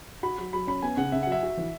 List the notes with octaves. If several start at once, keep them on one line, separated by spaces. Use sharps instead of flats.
F#4 B5
F#3
F#3 B5
C#4 B5
B3 G#5
C#3 F#5
C#3 E5
F#5
F#3 E5
F#4
E3